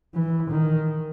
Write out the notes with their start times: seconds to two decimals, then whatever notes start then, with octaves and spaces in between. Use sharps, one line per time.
0.14 E3
0.51 D#3